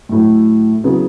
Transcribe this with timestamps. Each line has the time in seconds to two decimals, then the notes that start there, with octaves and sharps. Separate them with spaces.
0.09 A2 F#3 A3 E4
0.84 C#3 F#3 B3 E4 G#4